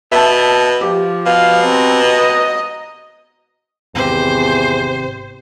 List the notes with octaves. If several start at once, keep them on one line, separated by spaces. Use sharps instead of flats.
B2 E5 A5
F3 G4
B2 F5
C4 A#5
D#5
G#1 E2 C3 G4 C5